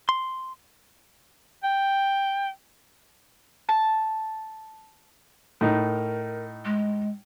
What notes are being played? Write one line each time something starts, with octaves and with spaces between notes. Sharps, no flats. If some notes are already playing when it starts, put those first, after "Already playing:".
C6
G5
A5
A2 D#4 A#4
G#3